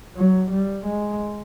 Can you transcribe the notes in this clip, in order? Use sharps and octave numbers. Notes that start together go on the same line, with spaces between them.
F#3
G3
G#3